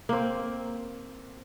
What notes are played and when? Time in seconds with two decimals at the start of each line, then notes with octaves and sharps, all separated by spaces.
0.09 A#3 C4